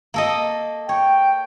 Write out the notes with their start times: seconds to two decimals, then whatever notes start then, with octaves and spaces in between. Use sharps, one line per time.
0.14 A#3 A4 D#5
0.89 C#5 G5